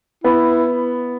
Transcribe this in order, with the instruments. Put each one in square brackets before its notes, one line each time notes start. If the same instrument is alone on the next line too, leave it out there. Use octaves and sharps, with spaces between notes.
[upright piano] B3 [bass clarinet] E4